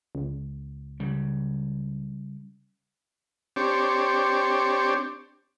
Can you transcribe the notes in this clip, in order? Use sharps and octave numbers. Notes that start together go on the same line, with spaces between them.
C#2
C#3 G3
C4 D4 G4 C#5